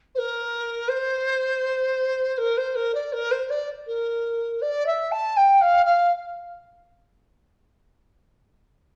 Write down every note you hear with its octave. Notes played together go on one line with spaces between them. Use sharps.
C5
A#4
C5
A#4
C5
A#4
D5
A#4
C5
D5
A#4
D5
E5
A5
G5
F5
F5